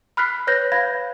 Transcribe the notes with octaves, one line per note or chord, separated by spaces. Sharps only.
B5 F6 F#6 B6 C7
B4 C#5 F#6 G6 A#6
F5 B5 G#6 A#6